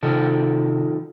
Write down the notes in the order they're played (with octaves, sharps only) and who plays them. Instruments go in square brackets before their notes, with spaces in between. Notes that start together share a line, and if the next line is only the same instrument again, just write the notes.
[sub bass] C3 [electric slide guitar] D#3 F3 A4